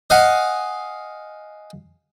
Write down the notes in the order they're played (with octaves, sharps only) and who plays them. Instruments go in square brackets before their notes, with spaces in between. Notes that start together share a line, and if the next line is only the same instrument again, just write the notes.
[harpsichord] D#5 F5 F#5 G#5